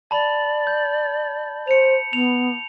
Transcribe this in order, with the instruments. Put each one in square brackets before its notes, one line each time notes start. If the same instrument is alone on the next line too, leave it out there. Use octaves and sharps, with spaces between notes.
[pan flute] D5 [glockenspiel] A5 B5 F#7
[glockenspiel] G6
[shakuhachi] C5 [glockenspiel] C#7 F7
[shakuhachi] B3 [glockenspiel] F7